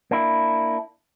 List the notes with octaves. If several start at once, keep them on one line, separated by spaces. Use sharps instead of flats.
A#3 D4 E4